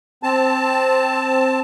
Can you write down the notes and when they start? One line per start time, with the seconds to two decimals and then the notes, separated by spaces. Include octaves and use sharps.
0.23 C4 A5